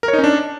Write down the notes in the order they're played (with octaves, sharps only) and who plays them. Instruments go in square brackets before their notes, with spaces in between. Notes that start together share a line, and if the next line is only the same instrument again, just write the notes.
[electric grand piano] A#4
C#5
D#4
C#4
D4